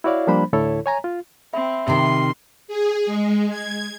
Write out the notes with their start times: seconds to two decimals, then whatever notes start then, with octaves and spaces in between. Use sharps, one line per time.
0.04 E4 F#4 C#5 D5 F5
0.27 F3 G3 A#3 D4 C5 B5
0.53 D2 A2 D3 E4 A4 C#5
0.86 C#5 G#5 A#5
1.04 F4
1.54 C4 E5 B5
1.88 C3 D#3 C6
2.68 G#4
3.06 G#3
3.49 G#6